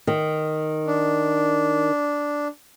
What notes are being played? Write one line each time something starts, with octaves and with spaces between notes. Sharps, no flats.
D#3
D4